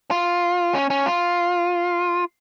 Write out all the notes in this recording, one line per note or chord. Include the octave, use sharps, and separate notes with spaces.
F4
C#4
C#4
F4